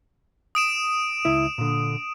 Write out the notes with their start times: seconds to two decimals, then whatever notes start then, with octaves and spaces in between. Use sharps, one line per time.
0.55 D#6 D7 E7
1.25 C#2 E4 E5
1.58 A#2 D3